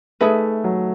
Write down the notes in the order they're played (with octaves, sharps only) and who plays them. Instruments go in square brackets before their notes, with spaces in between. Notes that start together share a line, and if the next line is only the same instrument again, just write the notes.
[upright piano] A3 [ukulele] D#4 G#4 B4 E5
[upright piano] F#3